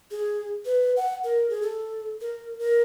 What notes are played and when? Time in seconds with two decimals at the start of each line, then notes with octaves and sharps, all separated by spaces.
0.11 G#4
0.65 B4
0.97 F#5
1.24 A#4
1.50 G#4
1.62 A4
2.21 A#4
2.59 A#4